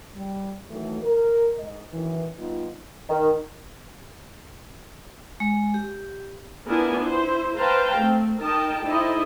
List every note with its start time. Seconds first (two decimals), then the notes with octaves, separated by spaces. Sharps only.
0.15 G3
0.70 D#3 E3 F#3 A3
1.03 A#4
1.58 G#2 D#5
1.92 F#2 D#3 E3
2.38 G3 B3 D#4 F4
3.09 D#3
5.40 G#3
5.74 G4
6.68 B3 D4 E4 F4 A#4 G#5
7.02 E4 C5
7.58 B4 C5 F5 G5 A5 A#5
7.98 A3 C4
8.42 D#4 A#4 D#5 G5 A5
8.85 D#4 E4 A4 C5 D5 D#5